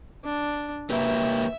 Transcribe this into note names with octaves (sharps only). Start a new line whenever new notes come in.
D4
A#3 G4 B4 E5